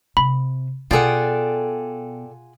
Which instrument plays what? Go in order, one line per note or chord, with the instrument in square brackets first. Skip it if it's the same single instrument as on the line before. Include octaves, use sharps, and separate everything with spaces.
[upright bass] C3 [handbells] B5
[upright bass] B2 [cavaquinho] F4 G#4 F#5 [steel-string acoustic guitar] A4 D5 G5